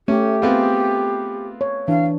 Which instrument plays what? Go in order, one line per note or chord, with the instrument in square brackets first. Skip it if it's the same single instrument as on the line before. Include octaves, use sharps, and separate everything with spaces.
[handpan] A3 [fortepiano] C#4 [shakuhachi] G4
[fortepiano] B3 C4 F4 [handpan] G#4
[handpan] C#5
[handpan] E3 D4 [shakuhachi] F5